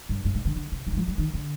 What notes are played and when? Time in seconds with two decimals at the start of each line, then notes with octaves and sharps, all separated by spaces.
0.09 G2
0.25 G2
0.35 C3
0.45 D3
0.56 D3
0.72 C3
0.87 D3
0.92 D#3
0.97 F3
1.08 G3
1.18 D#3
1.34 D3